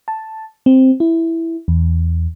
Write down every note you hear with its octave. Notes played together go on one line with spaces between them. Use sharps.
A5
C4
E4
E2